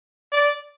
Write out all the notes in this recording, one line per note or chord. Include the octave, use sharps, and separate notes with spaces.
D5